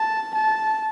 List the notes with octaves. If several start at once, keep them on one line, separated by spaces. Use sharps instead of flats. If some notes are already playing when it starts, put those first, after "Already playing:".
Already playing: A5
A5